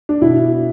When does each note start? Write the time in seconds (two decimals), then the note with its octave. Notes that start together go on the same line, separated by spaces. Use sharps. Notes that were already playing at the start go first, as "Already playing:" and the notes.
0.09 D4
0.22 B2 E4